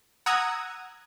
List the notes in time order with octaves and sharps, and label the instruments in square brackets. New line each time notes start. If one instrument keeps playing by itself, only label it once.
[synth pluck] F#5 A#5 D#6 E6 G#6